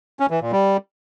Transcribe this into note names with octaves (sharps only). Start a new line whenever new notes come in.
C#4
E3
A#2
G3